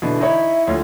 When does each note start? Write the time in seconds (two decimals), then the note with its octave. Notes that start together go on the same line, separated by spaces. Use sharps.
0.02 B2 D3 E3
0.20 D#4 E4 C#5 E5
0.67 D2 F4 C#5